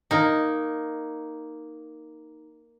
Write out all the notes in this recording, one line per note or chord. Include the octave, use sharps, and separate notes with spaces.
A#3 D#4